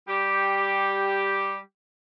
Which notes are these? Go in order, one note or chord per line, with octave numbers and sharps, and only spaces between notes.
G3 G4